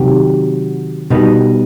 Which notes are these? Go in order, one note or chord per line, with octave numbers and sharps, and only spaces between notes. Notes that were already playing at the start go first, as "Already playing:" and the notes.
Already playing: C3 D#3 F#3 G4
B2 G3 B3 D#4